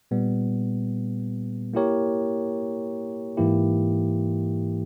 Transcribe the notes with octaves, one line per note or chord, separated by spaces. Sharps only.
A#2 G3 B3
A#3 E4 G4 A#4 C#5
G#2 E3 A#3 E4 G4